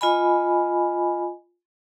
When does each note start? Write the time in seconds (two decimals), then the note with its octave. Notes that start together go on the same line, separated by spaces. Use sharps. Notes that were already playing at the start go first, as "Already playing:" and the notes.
0.01 F4 D#5 G#5 B5